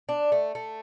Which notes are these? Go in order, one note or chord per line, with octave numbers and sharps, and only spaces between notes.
D4
A3
A3